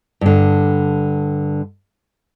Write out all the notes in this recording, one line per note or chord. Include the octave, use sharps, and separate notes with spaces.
G2 D3